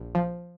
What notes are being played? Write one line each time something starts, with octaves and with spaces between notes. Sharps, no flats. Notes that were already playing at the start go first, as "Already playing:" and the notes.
Already playing: A#1
F3